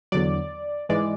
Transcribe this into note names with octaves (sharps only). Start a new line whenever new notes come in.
E2 D3 F#3 D5
G#2 E3 G#3 D5